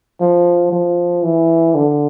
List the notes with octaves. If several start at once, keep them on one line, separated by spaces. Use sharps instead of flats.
F3
F3
E3
D3